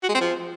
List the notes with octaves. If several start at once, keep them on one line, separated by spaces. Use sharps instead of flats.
F#4
G#3
C4
F3